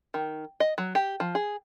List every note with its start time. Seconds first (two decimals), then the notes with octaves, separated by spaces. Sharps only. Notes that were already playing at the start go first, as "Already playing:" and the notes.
0.14 D#3
0.60 D#5
0.78 F#3
0.95 G4
1.20 F3
1.35 G#4